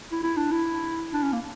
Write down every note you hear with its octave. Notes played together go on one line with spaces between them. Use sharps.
E4
E4
D4
E4
D4
C#4
A#3